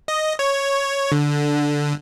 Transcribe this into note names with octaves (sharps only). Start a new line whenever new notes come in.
D#5
C#5
D3